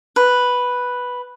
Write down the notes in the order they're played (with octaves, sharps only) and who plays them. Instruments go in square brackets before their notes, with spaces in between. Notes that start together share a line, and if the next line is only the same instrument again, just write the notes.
[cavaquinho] B4